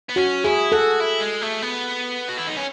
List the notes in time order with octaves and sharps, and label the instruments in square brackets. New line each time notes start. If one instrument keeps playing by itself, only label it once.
[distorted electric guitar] B3
[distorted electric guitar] C#4 [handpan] F#4
[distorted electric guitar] E4 [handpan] G#4
[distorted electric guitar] F#4 [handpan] A4
[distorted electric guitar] E4
G#3
A3
B3
F#4
E4
D#4
C#4